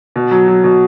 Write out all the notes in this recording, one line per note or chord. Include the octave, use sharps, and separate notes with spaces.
B2
F#3
F#3
B2